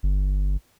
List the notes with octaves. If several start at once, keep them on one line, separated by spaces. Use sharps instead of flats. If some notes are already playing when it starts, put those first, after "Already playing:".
G1